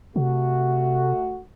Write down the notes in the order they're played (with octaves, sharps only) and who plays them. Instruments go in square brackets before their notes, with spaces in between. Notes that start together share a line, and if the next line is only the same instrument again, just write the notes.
[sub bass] C3 [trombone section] A3 F#4